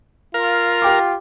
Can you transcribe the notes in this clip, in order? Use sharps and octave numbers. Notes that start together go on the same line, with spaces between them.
F4 A#4 F5
G4 G5 D6